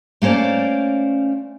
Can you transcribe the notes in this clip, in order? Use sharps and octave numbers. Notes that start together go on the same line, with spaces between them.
A3 A#3 C#4 C5 D5